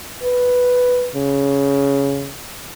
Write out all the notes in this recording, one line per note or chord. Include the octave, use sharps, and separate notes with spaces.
B4
C#3